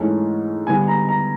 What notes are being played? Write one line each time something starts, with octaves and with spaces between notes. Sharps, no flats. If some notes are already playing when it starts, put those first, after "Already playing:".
Already playing: G#2 E3 A3 C#4
D3 G3 B3 G#5
A#5
A#5